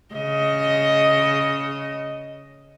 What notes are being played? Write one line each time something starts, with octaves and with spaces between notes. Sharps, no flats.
C#3 D#5